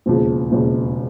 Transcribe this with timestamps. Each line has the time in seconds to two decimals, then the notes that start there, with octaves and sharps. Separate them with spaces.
0.06 E1 D#2 C#3 F3
0.52 E1 D#2 C#3 F3